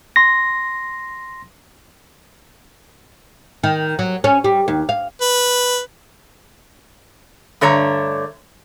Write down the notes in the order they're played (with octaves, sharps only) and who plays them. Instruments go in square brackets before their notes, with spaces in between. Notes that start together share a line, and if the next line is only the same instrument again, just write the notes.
[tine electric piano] C6 A#6
[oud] D#3
F#3
C#4
G3
D#2
F5
[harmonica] B4
[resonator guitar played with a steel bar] G2 D3 A3 C#5 A#5